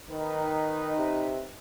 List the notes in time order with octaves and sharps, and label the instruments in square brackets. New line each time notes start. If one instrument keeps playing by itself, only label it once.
[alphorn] D#3 [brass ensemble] D#4 B4
[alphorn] C3